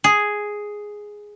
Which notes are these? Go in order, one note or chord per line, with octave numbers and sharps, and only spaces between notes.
G#4